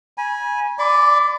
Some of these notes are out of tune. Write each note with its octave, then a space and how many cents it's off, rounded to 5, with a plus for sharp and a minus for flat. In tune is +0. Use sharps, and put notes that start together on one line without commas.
G#5 -5 B5 -40
D5 +0 B5 +35 D6 -30